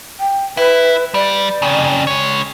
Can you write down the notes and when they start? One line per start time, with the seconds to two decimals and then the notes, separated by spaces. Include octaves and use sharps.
0.20 G5
0.57 E4 B4
1.14 G3 D5
1.62 F2 C#3
2.07 G#3 C#5